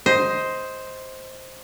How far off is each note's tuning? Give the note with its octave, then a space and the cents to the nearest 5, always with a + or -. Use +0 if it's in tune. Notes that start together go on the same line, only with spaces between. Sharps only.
C5 +0 D#5 +15